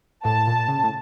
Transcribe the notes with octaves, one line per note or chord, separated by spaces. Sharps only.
A2 A5
A#2
C#3
A2